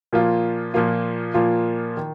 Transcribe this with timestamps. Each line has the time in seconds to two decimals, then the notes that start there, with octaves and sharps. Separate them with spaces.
0.13 A#2 F3 A#3 F4
0.74 A#2 F3 A#3 F4
1.34 A#2 F3 A#3 F4
1.97 D#3